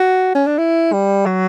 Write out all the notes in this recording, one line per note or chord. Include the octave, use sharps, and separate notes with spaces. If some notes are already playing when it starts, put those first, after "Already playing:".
Already playing: F#4
C#4
D4
E4
G3
F#3